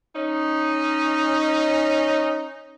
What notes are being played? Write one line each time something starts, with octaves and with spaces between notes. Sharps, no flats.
C#4 D#4